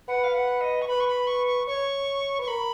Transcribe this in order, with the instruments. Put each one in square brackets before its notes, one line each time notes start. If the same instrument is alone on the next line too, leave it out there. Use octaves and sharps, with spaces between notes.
[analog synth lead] B4 [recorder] F#5
[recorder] F5
F#5
D#5
C#6
[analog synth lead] B4 [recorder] B5
[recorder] C#6
B5
C#6
C#6
[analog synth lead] C#5 [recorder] C#6
[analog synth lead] B4 [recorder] C#6
[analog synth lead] A#4 [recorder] B5